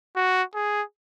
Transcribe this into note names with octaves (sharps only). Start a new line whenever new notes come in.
F#4
G#4